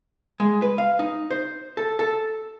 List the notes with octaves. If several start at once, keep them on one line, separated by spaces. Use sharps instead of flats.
G#3
B4
F5
D#4
C5
A4
A4